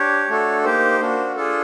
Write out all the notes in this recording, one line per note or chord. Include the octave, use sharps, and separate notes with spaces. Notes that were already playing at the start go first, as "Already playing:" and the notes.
Already playing: D4 G4 C#5
A3 D4 F#4 A4
A#3 D#4 G4 C5
A#3 D4 F#4
D4 F4 G#4 A4